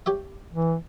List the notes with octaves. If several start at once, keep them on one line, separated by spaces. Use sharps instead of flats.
G4 C#5 E5
E3